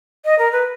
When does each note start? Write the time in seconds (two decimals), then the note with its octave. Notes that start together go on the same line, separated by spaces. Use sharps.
0.25 D#5
0.39 A#4
0.52 B4